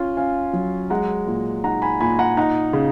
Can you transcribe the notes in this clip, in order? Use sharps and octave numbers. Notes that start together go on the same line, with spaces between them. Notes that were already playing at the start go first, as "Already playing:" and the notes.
Already playing: C#4 F4
C#4 F5 G#5
F#3
G#3 F#5 A#5
A#2
D#4 F#5 A#5
G#5 B5
A#2 G#5 B5
F#5 A#5
D#4 F#5 A#5
C#3